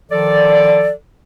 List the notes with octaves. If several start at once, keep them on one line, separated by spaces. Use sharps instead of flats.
D#3 F3 A4 D5